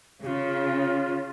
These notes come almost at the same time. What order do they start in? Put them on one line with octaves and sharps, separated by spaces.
C#3 G#4 F4